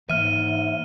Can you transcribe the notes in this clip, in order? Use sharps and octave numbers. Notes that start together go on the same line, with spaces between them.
G#2 E3 A#3 E5 F6 D#7